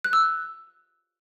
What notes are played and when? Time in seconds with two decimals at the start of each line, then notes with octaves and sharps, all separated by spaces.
0.04 F#6
0.13 E6